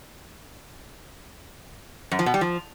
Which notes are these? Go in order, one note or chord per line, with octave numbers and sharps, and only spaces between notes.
F#2
F3
B2
G3
F3